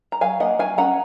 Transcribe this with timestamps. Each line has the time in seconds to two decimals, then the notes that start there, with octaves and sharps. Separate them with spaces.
0.12 A#5
0.21 F#3 F5 G#5
0.40 A#3 D#5 F#5
0.59 F#3 F5 G#5
0.78 C#4 F#5 A#5